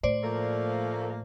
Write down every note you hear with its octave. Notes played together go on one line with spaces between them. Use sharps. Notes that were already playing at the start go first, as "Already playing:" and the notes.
A2 C5 D5
F3 A3 A#3